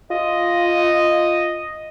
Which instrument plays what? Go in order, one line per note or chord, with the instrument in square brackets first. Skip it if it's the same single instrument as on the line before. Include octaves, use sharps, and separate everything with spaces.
[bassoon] F4 [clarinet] D#5